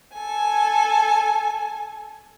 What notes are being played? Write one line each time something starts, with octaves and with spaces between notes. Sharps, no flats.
A4 G#5